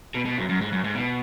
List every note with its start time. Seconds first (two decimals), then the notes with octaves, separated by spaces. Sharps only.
0.14 B2
0.25 B2
0.38 F#2
0.49 F#2
0.61 G#2
0.72 F#2
0.84 G#2
0.95 B2